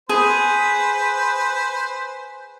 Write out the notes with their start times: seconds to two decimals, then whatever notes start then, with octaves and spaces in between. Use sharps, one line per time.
0.09 G#4 B4 C5